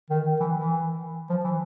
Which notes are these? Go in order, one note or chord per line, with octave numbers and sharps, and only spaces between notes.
D#3
E3
E3
F3
E3